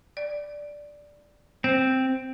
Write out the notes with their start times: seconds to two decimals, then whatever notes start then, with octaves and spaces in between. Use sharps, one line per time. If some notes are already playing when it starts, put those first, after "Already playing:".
0.17 D5
1.64 C4 C5